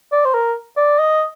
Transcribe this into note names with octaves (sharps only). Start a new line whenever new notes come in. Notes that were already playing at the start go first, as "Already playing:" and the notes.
D5
C5
A#4
D5
D#5